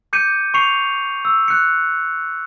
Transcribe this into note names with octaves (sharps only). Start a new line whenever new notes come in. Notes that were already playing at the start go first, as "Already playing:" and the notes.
D6 G6 C#7 D#7
C#6 C7 C#7 F7
E6
F#6 C#7